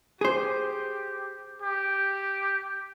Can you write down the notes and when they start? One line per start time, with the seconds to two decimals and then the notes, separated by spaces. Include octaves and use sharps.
0.21 G4 G#4 C5
1.62 G4